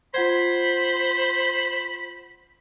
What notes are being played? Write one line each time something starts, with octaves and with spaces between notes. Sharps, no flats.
F4 C5 F#5 B5 G#6